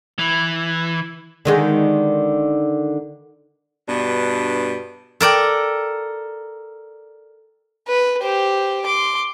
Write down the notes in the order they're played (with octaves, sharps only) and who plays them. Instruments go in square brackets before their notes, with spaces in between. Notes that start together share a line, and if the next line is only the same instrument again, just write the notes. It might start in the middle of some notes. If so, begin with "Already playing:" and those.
[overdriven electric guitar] E3
[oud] D3 D#3 G#3
[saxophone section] G2 B2 D4
[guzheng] A4 A#4 D5 G5
[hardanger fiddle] B4
G4 C5
C6 D6